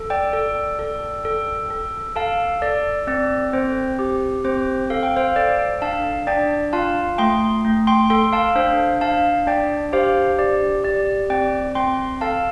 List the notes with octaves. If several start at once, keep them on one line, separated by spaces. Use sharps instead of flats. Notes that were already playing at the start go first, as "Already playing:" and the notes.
Already playing: A4
D5 G5
A4
A4
A4
A4
A4 F5 A5
A4 D5
C4 D5
C4 C5
G4
C4 C5
A4 F5
G5
C5 F5
A4 D5 G5
D4 F5 A5
D4 D5 G5
F4 F5 A5
A3 G5 C6
A3
G5 C6
A4 G5 C6
F5 A5
D4 C5 F5
D4 F5 A5
D4 D5 G5
G4 C5 F5
G4 D5
G4 D5
C4 D5 G5
C4 G5 C6
A4 F5 A5